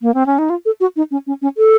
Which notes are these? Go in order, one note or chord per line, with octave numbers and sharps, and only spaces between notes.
A#3
C4
C#4
D#4
F4
A4
F#4
D#4
C#4
C#4
C#4
A4